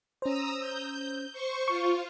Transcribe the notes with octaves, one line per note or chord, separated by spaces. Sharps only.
C#4 C5 A#5 D#6 E6
G6
C5 C#6
F4 C#6